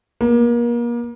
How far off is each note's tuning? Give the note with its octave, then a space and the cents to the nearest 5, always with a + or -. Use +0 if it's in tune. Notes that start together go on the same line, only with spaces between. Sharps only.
A#3 +35